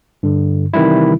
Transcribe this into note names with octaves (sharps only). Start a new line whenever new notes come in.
G2 D3
C3 D#3 E3 G3 E4